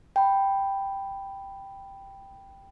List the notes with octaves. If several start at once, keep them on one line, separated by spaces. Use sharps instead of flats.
G5 B5